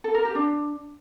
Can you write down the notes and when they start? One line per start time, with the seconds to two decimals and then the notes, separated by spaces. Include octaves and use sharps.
0.04 A4
0.14 A#4
0.25 G4
0.35 D4